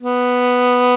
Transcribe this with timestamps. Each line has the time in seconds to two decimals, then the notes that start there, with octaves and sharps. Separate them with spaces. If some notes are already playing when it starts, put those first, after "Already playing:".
0.02 B3